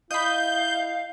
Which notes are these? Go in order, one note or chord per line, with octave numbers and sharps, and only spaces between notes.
E4 D#5 F5 B5 G6